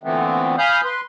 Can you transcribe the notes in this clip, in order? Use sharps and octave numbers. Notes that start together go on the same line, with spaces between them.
A#2 D3 E3 A3 B3 C4
F5 G#5 B5 D#6 F6 G6
B4 C6